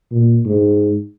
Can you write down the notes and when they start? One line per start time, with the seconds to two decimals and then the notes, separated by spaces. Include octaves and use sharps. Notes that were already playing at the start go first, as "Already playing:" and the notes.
0.12 A#2
0.46 G#2